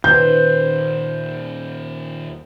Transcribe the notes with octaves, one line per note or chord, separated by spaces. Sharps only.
D#2 A#2 D#3 B4 C5 G6